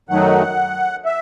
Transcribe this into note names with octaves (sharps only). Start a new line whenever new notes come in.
F#2 D#3 F#3 A3 D#4 F#5
E5